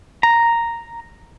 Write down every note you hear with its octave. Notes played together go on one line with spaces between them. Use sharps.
A#5